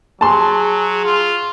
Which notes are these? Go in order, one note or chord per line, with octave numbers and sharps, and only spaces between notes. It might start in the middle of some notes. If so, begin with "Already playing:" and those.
F#3 G#4 A5 C6
F4